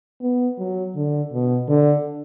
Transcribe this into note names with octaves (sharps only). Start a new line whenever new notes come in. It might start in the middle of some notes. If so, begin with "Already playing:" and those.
B3
F#3
D3
B2
D3